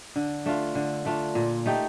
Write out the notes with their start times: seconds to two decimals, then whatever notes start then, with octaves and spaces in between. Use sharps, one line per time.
0.16 D3
0.46 A3 D4 F4
0.75 D3
1.06 A3 D4 F4
1.35 A#2
1.66 A3 D#4 G4